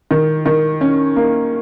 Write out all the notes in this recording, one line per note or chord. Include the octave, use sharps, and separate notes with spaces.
D#3
D#3
C#4
A#3